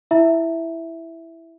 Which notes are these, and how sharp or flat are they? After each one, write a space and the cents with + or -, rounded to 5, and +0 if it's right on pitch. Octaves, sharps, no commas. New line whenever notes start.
E4 +5 E5 +0 A#5 +45